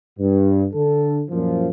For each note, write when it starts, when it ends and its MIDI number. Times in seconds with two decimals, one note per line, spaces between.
0.19 0.65 43
0.73 1.22 50
0.73 1.22 69
1.30 1.70 42
1.30 1.70 46
1.30 1.70 53